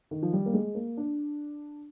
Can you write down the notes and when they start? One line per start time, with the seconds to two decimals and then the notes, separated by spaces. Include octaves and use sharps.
0.11 D#3
0.23 F3
0.33 G3
0.46 A#3
0.54 G#3
0.75 A#3
0.97 D4